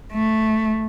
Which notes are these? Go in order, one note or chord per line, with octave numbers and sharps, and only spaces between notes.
A3